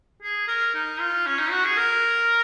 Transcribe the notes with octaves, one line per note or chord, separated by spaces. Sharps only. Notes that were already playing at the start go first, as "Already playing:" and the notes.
G#4
A#4
D#4
F4
C#4
D#4
F#4
G#4
A#4